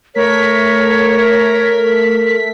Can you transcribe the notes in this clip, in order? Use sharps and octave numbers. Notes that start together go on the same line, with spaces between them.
A3 A#4 C#5 B6